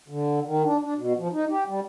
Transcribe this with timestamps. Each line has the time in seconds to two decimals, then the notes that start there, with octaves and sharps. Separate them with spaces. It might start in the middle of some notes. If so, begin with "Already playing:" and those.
0.08 D3
0.45 D#3
0.65 D4
0.83 D4
0.97 B2
1.18 F3
1.33 D#4
1.50 G4
1.68 G3